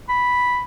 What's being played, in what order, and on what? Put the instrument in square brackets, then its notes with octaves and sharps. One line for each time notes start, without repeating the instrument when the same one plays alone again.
[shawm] B5